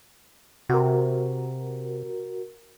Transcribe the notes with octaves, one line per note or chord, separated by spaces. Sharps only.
C3 F#4 A#4